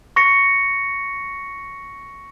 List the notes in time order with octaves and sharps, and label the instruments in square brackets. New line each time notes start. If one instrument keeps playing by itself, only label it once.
[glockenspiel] C#6 A#6 C#7